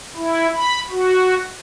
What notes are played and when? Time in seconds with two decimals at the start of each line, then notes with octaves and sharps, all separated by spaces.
0.16 E4
0.56 B5
0.90 F#4